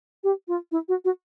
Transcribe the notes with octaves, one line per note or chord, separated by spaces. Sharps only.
G4
F4
E4
F#4
F#4